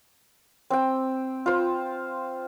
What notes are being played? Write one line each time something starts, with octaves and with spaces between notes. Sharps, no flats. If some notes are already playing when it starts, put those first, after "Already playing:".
C4 G5
F4 C5